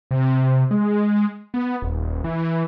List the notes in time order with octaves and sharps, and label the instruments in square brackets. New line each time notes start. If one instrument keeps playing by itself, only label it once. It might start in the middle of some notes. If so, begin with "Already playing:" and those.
[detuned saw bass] C3
G#3
B3
D#1
E3